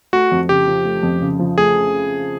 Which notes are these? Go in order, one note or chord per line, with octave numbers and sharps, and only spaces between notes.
A3 F#4
F2
C#3 G4
F3
A3
F2
C#3
F3
A3 G#4